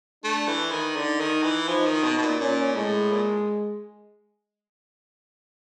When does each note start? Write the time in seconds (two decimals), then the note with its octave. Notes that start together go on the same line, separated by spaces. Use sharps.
0.24 A3 D4
0.48 E3
0.72 D#3
0.95 D3 D#4
1.20 D#3
1.44 E3
1.68 F3 D#4
1.86 D#3
2.04 B2
2.18 B2
2.22 A#2
2.40 A#2 C#4
2.75 A2 G#3
3.12 A#2